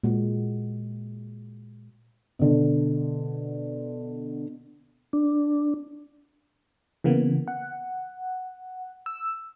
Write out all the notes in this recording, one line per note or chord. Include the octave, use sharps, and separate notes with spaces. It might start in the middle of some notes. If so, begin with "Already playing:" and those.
A#2 G#3 F#4
B2 D3
D4
C#3 E3 A#3 B3
F#5
E6